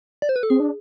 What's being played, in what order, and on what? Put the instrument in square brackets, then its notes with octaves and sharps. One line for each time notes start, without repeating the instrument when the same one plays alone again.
[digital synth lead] D5
C5
B4
A4
[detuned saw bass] C4 [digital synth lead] G#4
[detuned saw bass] D4